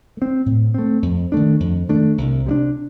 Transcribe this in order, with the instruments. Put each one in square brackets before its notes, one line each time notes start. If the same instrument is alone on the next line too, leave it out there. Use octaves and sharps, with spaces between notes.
[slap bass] A3
C4
A2
A3 C4
F2
D#3 A3 D4
F2
D#3 A3 D4
C2
C3 G3 D4